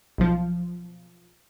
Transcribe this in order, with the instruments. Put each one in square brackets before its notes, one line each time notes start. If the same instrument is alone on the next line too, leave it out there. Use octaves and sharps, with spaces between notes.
[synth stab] B1 F3